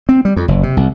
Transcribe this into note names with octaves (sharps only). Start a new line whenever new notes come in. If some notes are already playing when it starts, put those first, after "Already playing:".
C4
G3
F2
F#1
C3
C2